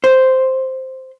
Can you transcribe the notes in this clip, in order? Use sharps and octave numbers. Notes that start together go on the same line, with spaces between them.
C5